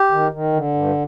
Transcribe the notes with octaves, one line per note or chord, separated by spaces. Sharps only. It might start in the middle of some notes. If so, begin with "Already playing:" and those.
Already playing: G4
D#3
D#3
D3
G2